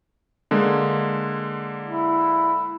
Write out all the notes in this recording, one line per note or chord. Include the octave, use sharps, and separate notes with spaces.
D3 G#3 A#3
E4